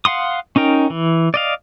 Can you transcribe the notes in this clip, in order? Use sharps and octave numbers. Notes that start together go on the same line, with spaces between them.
F5 F#5 C6 D#6
C#4 D#4 A#4 G5
E3
D5 D#5 F5